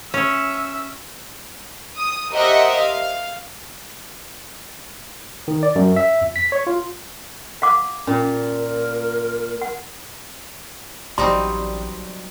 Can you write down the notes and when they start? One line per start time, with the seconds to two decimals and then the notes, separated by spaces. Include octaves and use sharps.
0.14 C#4 E5
1.97 D#6
2.32 G4 A#4 C5 D#5 E5 F#5
2.76 F5
5.48 D#3
5.63 D5
5.75 F#2
5.96 E5
6.21 F2
6.36 B6
6.52 C#5
6.67 F4
7.62 F5 F#5 D6
8.07 A#2 C#4
8.59 A#4
9.62 F#5
11.18 A1 F#3 G3 C4 D#4 D5 C6